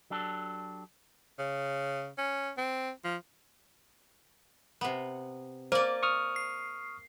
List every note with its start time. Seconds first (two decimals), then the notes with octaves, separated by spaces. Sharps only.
0.10 F#3 D4 G4 A4
1.39 C#3
2.18 C#4
2.57 C4
3.04 F3
4.81 C3 B3
5.72 A#3 C5 D5
6.03 C#6 D#6 F6
6.36 C7